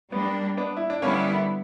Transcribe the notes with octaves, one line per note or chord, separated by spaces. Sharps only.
G3 A#3 B3 D4
B3 D4
E4
D4
D3 G3 A#3 B3 C#4 E4